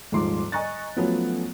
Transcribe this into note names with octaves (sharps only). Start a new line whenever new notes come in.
D#1 G#2 F3 C6 D6
D#5 G#5 A#5 C#6 F#6 A6
F3 F#3 A3 B3 C#4 F#4